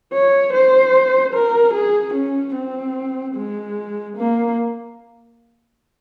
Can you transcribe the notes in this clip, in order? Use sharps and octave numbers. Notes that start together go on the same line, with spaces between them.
C#5
C5
A#4
G#4
C#4
C4
G#3
A#3